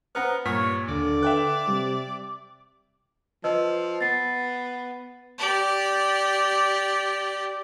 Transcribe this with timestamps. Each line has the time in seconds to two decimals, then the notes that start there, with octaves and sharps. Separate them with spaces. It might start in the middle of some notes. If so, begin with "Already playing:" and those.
0.15 B3 C#4 B4 C5 F#5 A#5 F6
0.45 G2 A#2 G3 C#5 F6 B6
0.88 D#2 D3 D5
1.23 B4 E5 F5 G5 F#6
1.68 C3 G3
3.44 F3 B4 D#5 E6
4.01 B3 A6 C7
5.38 G4 D5